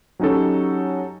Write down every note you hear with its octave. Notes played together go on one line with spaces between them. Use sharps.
F#3 C#4 D#4 G4 A4